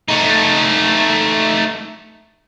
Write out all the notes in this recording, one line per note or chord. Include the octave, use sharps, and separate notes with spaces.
A3 D#4